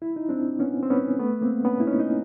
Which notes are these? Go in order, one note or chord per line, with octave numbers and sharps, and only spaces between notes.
E4
D#4
C4 D4
B3 C#4
C4
B3 C#4
A3 B3
A#3 C4
B3 C#4
E4
C#4 D#4
D#4